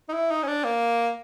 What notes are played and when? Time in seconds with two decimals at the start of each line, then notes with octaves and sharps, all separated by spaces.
0.09 D#4
0.14 E4
0.31 D#4
0.43 C#4
0.47 D4
0.64 A#3